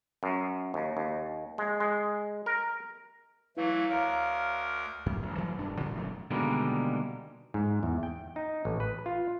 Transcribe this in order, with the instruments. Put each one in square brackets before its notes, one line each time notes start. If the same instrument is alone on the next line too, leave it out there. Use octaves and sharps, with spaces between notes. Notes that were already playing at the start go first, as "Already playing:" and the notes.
[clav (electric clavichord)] F#2
D#2
D#2
G#3
G#3
A#4
[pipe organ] E3 F#3 A3 [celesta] E4 B4 F5
[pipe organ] D2 A#4 [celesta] C#5 F5 A#5
[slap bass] F#2
A1 G2
E3 F#3 G3 A3
E1 G2 D4
A#2 D3 D#3 F3
E1 F#2 E3 A3
[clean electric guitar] B2 D3 D#3 G3 G#3 A#3
[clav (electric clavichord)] G#2
E2
G5
D#4
A1
B4
F4